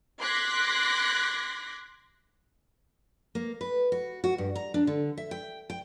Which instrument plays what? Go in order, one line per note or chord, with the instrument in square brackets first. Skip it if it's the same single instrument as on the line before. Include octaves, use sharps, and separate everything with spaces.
[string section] C6 D6 F#6 G#6 A#6 B6
[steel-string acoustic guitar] A#3
B4
F#4
F#4
G2
A#5
D4
D3
E5
G5
G5